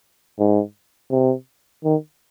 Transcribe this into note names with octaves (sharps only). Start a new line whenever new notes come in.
G#2
C3
D#3